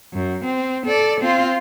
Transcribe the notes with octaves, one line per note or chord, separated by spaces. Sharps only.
F#2
C4
A4 D5
C4 F4